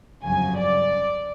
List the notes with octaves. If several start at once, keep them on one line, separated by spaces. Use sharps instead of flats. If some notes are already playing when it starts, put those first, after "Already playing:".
G1 F2 C#3 F#3 G#5
D5